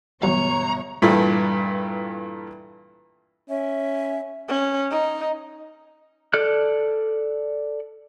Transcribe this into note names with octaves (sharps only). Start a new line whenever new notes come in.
G1 B2 E3 F#3 G3 C#5 A#5
G2 A#2 E3 A3
C#4 E5
C#4
D#4
A4 D5 F6 F#6